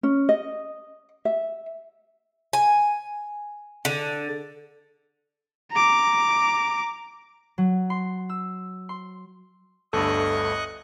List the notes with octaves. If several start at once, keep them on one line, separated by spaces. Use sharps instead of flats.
C#4
D#5
E5
G#5
D3
A#5 D6
F#3
C6
E6
C6
G1 D2 G2 A4 D#5 C#6 F#6